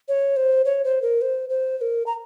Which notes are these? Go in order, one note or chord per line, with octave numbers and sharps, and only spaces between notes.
C#5
C5
C#5
C5
A#4
C5
C5
C5
A#4
A#5